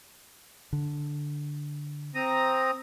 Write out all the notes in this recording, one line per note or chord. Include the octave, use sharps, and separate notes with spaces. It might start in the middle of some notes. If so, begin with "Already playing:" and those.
D3
C4 A#5 D#6